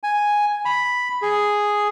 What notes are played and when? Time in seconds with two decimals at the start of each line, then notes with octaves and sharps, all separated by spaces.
0.03 G#5
0.65 B5
1.22 G#4